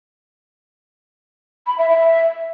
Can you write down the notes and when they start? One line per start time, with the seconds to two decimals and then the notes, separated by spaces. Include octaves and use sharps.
1.67 B5
1.78 E5
1.90 E5